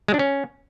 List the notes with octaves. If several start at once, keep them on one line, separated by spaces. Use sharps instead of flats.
G#3
D4
C#4